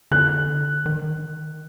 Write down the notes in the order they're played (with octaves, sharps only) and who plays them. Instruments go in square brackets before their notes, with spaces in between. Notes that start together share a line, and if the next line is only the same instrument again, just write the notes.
[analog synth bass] D3 [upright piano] F#6
[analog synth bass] D#3